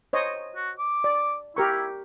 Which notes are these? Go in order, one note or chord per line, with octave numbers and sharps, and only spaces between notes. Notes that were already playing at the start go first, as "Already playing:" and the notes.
C5 C#5 D#5
F#4
D6
D5
E4 G4 A#4 C#6